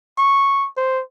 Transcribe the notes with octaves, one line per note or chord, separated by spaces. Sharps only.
C#6
C5